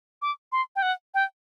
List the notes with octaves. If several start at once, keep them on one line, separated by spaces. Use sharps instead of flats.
D6
C6
G5
F#5
G5